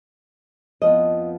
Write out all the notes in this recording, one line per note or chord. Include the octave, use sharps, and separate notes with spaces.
F2 F3 B3 D#5